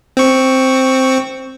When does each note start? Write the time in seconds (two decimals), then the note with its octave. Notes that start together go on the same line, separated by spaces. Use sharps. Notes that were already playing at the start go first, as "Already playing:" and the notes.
0.17 C4 C#6